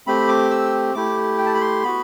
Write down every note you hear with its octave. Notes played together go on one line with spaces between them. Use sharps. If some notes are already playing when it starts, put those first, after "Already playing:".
A3 C4 G4 B5
D6
E6
A3 E4 G4 D6
G5
A5
B5
C6
B3 F#4 B5